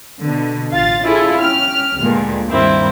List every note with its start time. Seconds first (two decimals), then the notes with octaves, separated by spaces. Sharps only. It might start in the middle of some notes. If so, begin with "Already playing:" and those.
0.21 B2 D3
0.72 A1 F4 F5 A6
1.04 C#4 E4 F4 G#4 A4
1.38 C#4 G4 F6
2.00 D2 G2 A#2 G#3
2.49 G2 D#3 A#3 C4 E4